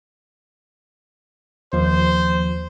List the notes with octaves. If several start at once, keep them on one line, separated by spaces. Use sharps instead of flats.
D#2 F3 C5